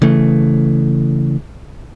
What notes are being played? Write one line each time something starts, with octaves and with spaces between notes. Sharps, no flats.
C#3 E3 A3